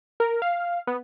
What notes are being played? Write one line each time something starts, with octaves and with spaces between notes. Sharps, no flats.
A#4
F5
B3